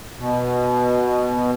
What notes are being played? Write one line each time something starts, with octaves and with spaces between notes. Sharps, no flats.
B2